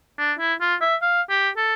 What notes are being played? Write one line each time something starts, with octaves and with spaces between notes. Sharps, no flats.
D4
E4
F4
E5
F5
G4
A4